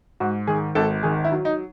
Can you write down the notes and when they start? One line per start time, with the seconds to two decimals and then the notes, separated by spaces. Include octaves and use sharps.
0.20 G#2 F#4
0.47 D#3 G#4
0.75 G#1 A4
1.03 D#3 G#4
1.25 E4
1.32 F#3
1.45 D#4